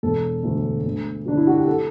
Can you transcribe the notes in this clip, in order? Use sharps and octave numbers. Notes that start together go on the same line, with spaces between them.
E1 A4
D2 D3 F#3
D2
D3 F#3 D4
E4
F#4
G4
A4